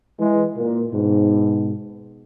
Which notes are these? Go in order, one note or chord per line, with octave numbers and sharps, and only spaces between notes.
E3 G#3
A#2
G#2 B2